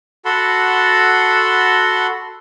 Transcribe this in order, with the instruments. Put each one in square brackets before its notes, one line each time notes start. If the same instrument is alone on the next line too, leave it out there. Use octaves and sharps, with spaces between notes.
[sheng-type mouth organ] F#4 A4 F#5 A5 B5 C6